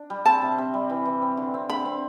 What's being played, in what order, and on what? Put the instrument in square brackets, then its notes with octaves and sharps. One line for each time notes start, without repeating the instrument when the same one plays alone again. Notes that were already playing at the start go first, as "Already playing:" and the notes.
Already playing: [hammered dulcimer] D4
G3
[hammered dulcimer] C4 [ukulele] A5
[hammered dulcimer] C3
C3
G3
E3
E3
C4
D3
C4
[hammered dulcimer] D3 [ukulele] B5
[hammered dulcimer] C4